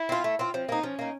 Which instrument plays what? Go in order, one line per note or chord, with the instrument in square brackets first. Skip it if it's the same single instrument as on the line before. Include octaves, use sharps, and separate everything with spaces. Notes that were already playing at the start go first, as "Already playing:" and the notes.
Already playing: [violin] E4
[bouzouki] C4 F4
A3
C4 F4
[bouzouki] F3 [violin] C4
[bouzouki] A#3 D#4
[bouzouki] F3 [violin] C#4
[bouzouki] A#3 D#4